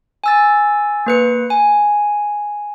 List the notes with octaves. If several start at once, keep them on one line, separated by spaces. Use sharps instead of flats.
G#5 E6 A6
A#3 B4 C#7
G#5